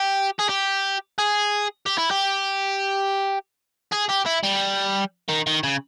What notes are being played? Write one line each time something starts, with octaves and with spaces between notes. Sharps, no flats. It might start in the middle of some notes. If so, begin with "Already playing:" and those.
Already playing: G4
G#4
G4
G#4
G4
E4
G4
G#4
G4
E4
G3
D#3
D#3
C#3